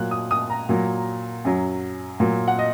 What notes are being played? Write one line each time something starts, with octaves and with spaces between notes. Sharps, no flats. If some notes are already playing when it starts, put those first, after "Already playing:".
Already playing: A#2 F#3 F#6
D#6
D#6
A#5
A#2 F#3
F#2 F#3
A#2 F#3
F#5
D#5